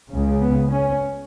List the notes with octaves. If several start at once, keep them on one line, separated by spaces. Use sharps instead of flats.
C#2 C#3
B3
C#4